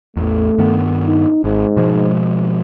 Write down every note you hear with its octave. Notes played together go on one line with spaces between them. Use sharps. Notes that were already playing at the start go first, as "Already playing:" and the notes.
A1 E2 A3
G2 D#3 B3
D#4
G#1 G#2
B2 F3 G#3